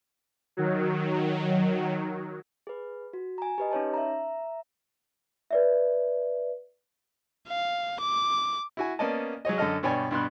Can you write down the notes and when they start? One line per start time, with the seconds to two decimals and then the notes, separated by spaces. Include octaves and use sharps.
0.57 D#3 F#3
2.67 G#4 B4
3.13 F#4
3.38 G#5 A#5
3.58 G4 B4 D#5
3.71 C#4 D#4 C#5 A5
3.94 E5 A#5
5.51 B4 D5 E5
7.48 F5
8.00 D6
8.77 E4 F#4 G#5
8.99 A#3 B3 C#4 D5 D#5 A5
9.45 F#3 G#4 C#5 D#5
9.58 F#2 D3 A4 D#5 F6
9.83 G2 B2 C#5 D5 G5 G#5
10.11 G2 B2 C6 F#6